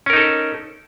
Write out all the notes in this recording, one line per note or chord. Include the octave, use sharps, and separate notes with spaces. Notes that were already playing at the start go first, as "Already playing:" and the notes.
C#4 D#4 A4 A#4